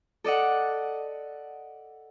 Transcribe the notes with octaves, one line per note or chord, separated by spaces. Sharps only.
A4 D5 D#5 F#5